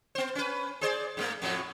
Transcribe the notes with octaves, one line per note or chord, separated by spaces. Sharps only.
B3 C5
C#4 B4
G#4 C5 D5
G#2 F3 A3
F2 A2 F#3